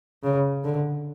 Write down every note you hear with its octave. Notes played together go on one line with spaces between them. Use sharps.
C#3
D3